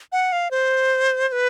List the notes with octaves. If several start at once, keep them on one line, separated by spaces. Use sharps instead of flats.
F#5
F5
C5
C5
B4